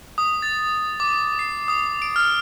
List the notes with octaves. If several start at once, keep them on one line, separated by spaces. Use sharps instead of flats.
D#6
A6
D6
C7
D#6
D7
F6